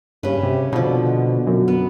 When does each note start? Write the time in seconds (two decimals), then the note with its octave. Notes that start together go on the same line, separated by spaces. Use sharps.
0.23 G2 C#3 B4
0.43 C3
0.73 B2 D3 F3
1.47 F#2
1.68 B3